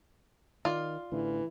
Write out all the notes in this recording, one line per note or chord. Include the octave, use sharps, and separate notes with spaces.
D#3 F4 D5
A1 D3 E3